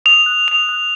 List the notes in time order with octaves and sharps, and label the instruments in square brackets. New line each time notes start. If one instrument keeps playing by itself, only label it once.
[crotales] D#6 F7
F#6
D#6 F7
F#6